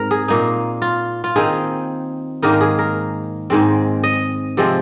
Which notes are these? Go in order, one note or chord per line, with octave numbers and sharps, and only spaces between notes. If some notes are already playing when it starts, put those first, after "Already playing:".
Already playing: G#2 C4 A#4
G#4
A#2 A#3 D#4
F4
F4
D#3 C4 D#4 G#4
G#2 D#3 A#3 D#4 A#4
G#4
A#4
G#2 D#3 G#3 C4
D#5
C3 F3 G#3 C4